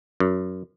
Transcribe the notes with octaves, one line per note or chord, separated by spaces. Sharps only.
F#2